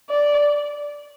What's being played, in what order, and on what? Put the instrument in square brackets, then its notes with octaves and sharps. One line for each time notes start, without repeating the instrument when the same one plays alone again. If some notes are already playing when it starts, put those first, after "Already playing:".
[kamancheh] D5